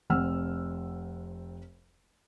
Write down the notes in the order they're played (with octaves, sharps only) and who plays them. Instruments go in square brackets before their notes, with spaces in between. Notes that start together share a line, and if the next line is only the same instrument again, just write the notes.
[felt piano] F1 C4 F#5 E6 F6